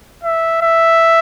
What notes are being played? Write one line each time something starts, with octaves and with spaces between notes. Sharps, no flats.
E5
E5